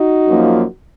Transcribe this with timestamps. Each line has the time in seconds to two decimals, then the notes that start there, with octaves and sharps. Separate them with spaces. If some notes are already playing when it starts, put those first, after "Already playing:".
Already playing: D#4 F#4
0.28 F#2 F3 A#3